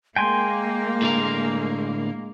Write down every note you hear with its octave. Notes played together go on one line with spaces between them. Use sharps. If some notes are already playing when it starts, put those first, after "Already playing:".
G#3 A#3 G5 G#5 C6
A2 D3 A#4